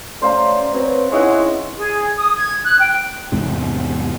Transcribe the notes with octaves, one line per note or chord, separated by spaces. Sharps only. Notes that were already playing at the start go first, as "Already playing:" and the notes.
G3 A3 C#4 C5 F5 A#5
F#3 C4 B4
G#3 C#4 D#4 E4 C#5 E5 F#5
G#4
D#6
G#6
F#6
G5
E2 G#2 C3